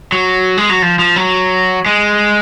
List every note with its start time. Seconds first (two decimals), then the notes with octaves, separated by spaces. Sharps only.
0.12 F#3
0.57 G#3
0.70 F#3
0.82 F3
0.99 F3
1.16 F#3
1.86 G#3